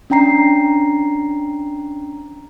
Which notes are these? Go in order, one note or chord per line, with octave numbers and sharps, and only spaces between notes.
C#4 D4 G5 A#5 C7